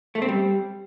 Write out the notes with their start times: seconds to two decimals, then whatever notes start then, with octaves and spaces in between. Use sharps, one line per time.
0.15 A3
0.22 C4
0.28 G3